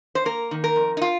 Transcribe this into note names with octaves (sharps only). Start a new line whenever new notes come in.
C5
A#3 A#4
D#3
A#4
F2
D#4
F4